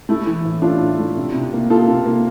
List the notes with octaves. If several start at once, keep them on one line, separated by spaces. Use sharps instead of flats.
A3 E4
E3
A2
A2 D4 F4
A2
A3
C3
C3
A#3
A#3 F4 A4
C3
A#3